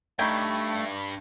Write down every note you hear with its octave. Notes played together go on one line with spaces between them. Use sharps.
G2 A3 D#4 G5 B5 C#6 G#6